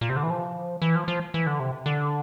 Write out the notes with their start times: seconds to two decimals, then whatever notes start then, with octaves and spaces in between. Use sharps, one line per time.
0.01 A#2
0.09 C3
0.16 D3
0.23 E3
0.30 F3
0.82 E3
0.96 F3
1.08 F3
1.34 E3
1.47 D3
1.60 C3
1.86 D3